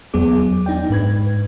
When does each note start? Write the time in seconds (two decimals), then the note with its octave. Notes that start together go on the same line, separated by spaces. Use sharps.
0.14 E2 F#3 B3 G#4 D6
0.66 D4 D#4 D5 G5
0.90 G#2 B4 G#6